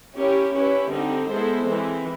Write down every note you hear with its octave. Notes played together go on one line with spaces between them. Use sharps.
C#4 E4 G4 A#4
C#4 E4 G4 B4
D3 G3 C4 D#4
G#3 B3 E4 A4 C5
E3 G#3 C4